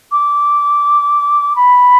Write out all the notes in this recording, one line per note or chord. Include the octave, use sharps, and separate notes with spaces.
D6
B5